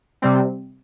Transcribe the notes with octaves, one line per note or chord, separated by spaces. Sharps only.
C3 G3 C4